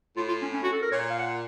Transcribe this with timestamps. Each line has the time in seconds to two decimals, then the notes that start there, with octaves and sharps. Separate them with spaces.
0.16 A2 F4
0.28 F4
0.42 C#4
0.53 C#4
0.63 F#4
0.73 A4
0.82 A#4
0.92 A#2 C#5
1.10 F5
1.19 F#5